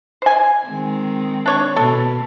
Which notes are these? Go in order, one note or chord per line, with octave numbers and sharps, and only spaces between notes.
C5 G#5
D#3 G#3 C4
D4 C#5 C#6
B2 A4